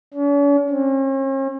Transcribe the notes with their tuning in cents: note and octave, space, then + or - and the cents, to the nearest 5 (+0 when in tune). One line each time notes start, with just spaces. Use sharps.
C#4 +45
C#4 -45